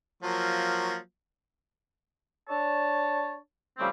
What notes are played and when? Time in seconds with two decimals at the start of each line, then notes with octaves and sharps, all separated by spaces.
0.23 F3 F#3 A#3
2.49 D4 C#5 A5
3.78 C#3 F3 G3 A3 C4